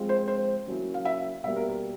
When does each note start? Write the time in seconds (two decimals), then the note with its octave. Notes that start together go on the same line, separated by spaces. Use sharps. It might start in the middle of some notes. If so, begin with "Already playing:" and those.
Already playing: F3 G#3 C4 F4 G#4
0.09 C5
0.28 C5
0.67 C#3 F#3 A#3 C#4 E4
0.94 F5
1.05 E5
1.44 B2 G3 A#3 E5
1.56 A#4
1.69 A#4